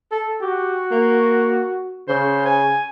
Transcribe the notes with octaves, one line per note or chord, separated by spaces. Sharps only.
A4
F#4 G4
A#3
C#3 C5
G#5